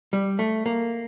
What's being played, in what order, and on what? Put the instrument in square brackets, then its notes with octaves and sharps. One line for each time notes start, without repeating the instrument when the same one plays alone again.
[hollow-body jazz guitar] G3
A3
A#3